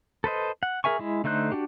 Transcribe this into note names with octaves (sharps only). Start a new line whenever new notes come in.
A4 B4 C5 D#5
F#5
G#4 A#4 E5 G#5 C#6
G#3 E4
D3 A3 D#4 C5 F#6
D4 F#4 G4